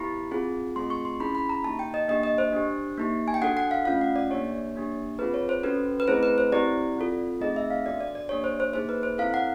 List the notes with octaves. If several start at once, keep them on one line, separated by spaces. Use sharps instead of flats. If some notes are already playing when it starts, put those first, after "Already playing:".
Already playing: B3 E4 G4 B5
C4 F4 G#4
A3 C4 F4 G#4 C6
C#6
C6
C#4 E4 G#4 B5
B5
A#5
A#3 D#4 G4 A5
G5
D#5
A#3 D4 G4 D#5
D#5
C5
D4 G4
A#3 D#4 G4
G#5
G5
D4 F#4 A4 F#5
F#5
F5
A3 C#4 F4 F5
F#5
D5
A#3 D4 G4 C#5
A#3 D4 G4
C4 F4 G#4 B4
C#5
C5
C#4 F#4 A4 B4
B4
A3 C4 E4 G#4 C5
B4
C5
C4 E4 G4 D5
C4 F4 A4
A3 C4 D#4 G#4 D#5
E5
F5
B3 D4 F#4 A4 D5
D5
D5
A#3 D4 G4 C#5
C5
C5
A#3 D#4 G#4 C5
B4
C5
C4 E4 A4 F5
F#5